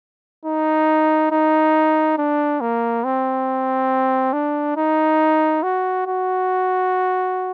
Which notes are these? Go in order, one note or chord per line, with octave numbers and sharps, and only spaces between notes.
D#4
D#4
D4
A#3
C4
D4
D#4
F#4
F#4